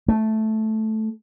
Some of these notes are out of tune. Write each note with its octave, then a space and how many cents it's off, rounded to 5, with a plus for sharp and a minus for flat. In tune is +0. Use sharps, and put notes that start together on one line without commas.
A3 -5